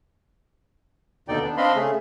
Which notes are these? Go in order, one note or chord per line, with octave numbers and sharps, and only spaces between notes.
D#2 B2 D3 D#4 D5 G5
B3 D4
C4 D4 D#5 F5 B5 C6
C#3 A3 G#4